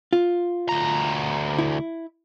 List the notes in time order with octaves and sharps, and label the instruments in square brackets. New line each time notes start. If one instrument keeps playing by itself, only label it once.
[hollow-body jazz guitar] F4
[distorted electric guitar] D2 A#5
[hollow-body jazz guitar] E4